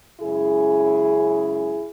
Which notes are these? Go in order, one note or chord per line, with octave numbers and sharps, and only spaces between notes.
F#2 C#3 G#3 E4 G#4